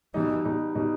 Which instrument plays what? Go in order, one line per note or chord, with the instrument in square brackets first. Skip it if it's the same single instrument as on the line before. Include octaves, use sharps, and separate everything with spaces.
[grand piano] B2 G3 D#4 [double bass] E3
[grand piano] B2 G3 D#4
B2 G3 D#4